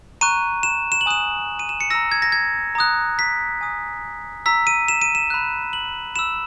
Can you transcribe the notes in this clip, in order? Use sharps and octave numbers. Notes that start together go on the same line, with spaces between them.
A#5 C#6 F#6 D#7
E7
E7
F#7
G#5 D#6 F#6 E7
D#7
E7
C#7
A#5 E6 A#6
G#6
A#6
G#6
A#5 D#6 F#6
B6
G#5 D#6 F#6
A#5 E6 B6
D#7
E7
D#7
E7
B5 F#6
F#7
B5 E6 E7